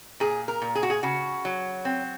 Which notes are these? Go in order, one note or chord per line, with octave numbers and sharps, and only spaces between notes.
A#2 G#4
A#4
A#2
G#4
F#4
G#4
C#3 F#4
F#3
C4